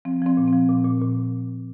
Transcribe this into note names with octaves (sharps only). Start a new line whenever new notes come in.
F3 C4
F3 C4
A#2
C4
F3
A#2
A#2
A#2